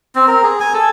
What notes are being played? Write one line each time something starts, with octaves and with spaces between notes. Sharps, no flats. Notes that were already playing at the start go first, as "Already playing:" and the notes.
C4
A#4
G#4
G#5
A4